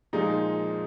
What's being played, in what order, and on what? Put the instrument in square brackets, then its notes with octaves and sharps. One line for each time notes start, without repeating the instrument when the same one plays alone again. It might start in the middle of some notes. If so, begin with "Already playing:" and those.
[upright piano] A#2 F3 G#3 D#4